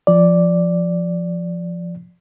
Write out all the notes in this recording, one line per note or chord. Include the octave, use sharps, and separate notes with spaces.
F3 D5